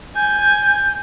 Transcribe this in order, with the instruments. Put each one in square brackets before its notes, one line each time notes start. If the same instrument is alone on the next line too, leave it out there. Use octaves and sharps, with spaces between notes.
[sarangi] G#5 [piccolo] G6